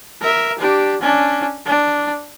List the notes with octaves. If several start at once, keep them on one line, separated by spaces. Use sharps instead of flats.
A#4 E5
D4 G4
C#4 D4
D4